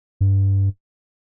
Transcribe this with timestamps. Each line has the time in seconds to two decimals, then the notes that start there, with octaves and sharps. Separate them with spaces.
0.21 G2